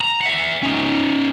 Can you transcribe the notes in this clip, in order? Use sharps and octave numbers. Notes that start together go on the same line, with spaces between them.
A#5
E5 F#5
C#4 D#4